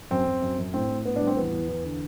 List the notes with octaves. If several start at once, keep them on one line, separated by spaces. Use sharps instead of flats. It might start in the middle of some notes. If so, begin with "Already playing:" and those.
F#2 C4
F#2
F#2
F#2
A2 C4
A2
A2 B3
G3 D4
C4
E2 B3
E2
E2
D3